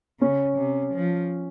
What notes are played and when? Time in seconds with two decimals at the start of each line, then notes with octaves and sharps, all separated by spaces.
0.20 C#3 C#4
0.57 C3
0.94 F3